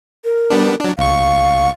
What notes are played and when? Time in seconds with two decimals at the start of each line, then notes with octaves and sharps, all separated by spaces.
0.25 A#4
0.50 G3 B3 D4
0.81 F#3 D4
0.98 C#2 F5 C#6